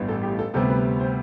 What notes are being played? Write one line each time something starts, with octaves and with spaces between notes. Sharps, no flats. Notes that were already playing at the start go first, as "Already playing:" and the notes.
Already playing: A1 G2 E3 B3
A4
G4
A4
D2 C3 G3 B3 A4
B4
C5